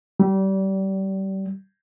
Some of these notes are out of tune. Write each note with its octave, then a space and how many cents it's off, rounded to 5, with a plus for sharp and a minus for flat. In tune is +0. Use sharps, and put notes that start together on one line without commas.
G3 -30